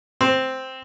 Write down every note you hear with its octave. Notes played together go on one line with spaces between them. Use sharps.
C4